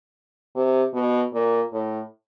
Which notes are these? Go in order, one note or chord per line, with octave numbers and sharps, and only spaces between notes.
C3
B2
A#2
A2